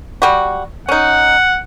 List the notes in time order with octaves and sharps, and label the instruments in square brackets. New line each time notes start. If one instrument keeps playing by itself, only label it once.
[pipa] G3 F#4
[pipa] C#4 D#4 [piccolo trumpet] F#5